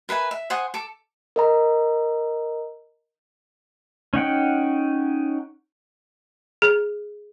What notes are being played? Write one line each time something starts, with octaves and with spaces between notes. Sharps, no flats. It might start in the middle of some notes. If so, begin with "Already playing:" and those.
A#4 B4 E5 G#5
E5
C5 F#5 G#5 D#6
A4 D6
A#4 D#5 A#5
C#4 D#4 F#5 G5
G#4